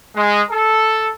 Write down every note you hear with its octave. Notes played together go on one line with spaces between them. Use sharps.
G#3
A4